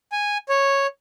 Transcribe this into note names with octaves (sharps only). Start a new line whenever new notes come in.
G#5
C#5